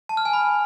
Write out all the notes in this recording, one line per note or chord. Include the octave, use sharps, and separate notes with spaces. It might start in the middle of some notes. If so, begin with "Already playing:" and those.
A5
F6
G#5
B5